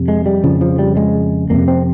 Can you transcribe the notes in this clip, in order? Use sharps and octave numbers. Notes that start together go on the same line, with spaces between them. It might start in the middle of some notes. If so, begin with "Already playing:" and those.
Already playing: F2 C3
G#3
G3
F2 C#3 F3
F3
G3
G#3
F2 C3 A#3
C4